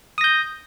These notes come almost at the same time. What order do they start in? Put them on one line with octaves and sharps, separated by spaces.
D#6 A#6 G6